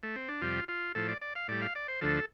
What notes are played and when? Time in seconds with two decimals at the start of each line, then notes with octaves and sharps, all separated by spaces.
0.03 A3
0.16 C4
0.29 D4
0.41 F2 C3 G3 F4
0.68 F4
0.95 A2 F3 A4
1.09 D5
1.22 D5
1.35 F5
1.48 A2 G3 D5
1.62 F5
1.75 D5
1.88 C5
2.01 D2 D3 F3 A4